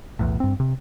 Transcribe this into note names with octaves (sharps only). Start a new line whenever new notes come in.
B1 E2 A2
G2 C4
C3